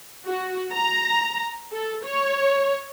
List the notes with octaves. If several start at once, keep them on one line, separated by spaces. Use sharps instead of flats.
F#4
A#5
A4
C#5